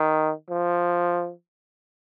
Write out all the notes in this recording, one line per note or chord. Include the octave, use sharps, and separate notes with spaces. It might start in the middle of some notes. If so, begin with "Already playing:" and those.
Already playing: D#3
F3